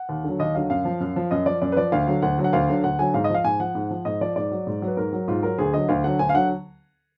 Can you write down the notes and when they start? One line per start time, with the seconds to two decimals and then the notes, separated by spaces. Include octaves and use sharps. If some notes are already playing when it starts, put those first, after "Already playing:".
Already playing: F#5
0.09 D#2
0.24 D3 F#3
0.39 D#2 D#5
0.55 D3 F#3 F5
0.70 F#2 F5
0.85 F3
1.00 F#2
1.16 F3
1.31 F#2 D#5
1.46 F3 D5
1.62 F#2 D5
1.72 B4
1.76 F3 D5
1.92 D2 F5
2.07 D3 F#3
2.22 D2 F#5
2.38 D3 F#3
2.44 F#5
2.53 D2 F5
2.68 D3 F#3
2.84 D2 F#5
2.99 D3 F#3 G#5
3.14 G#2 F5
3.24 D#5
3.30 F3 F5
3.44 G#2 G#5
3.60 F3 F#5
3.75 G#2
3.90 F3
4.05 G#2 D#5
4.21 F3 D5
4.36 G#2 D5
4.51 F#3
4.67 G#2
4.82 F#3
4.87 B4
4.97 G#2 A#4
5.13 F#3
5.28 G#2 F4
5.43 F#3 A#4
5.58 D2 G#4
5.74 D3 F#3 D#5
5.88 D2 F5
6.04 D3 F#3 F#5
6.19 D2 G#5
6.29 F5
6.34 D3 F#3 F#5